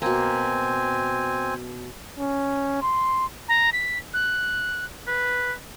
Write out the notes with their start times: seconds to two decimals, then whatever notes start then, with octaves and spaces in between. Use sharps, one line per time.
0.02 B2 A#3 C4 G#5
2.19 C#4
2.82 C6
3.48 A#5
3.73 B6
4.14 F#6
5.08 B4